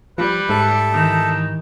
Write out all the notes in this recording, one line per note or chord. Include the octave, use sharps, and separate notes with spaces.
F3 G3 B4
G#2 A4 E5
D#3 E3 D#4